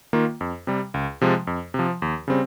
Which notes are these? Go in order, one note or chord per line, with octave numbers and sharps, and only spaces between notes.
D#3 A#3 F4
F2
C3 G3
C#2
C3 F3 G#3
F2
C3 F3
D#2
C#3 G3 C4